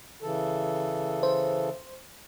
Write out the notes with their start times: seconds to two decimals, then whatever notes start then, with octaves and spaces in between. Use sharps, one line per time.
0.22 C#3 E3 A4
1.23 C5